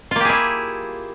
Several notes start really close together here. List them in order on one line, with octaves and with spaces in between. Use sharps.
F4 A#3 G4 G#4 E4